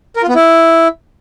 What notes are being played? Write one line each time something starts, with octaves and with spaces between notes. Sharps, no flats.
A#4
F4
B3
E4